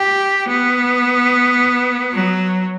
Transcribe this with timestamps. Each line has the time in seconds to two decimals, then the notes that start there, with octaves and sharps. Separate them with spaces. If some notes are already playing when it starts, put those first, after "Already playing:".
Already playing: G4
0.48 B3
2.13 F#3